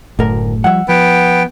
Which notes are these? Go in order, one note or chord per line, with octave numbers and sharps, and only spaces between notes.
F#1 D2 A2 A3 A#4
F3 G3 E5 F#5
F3 B3 G5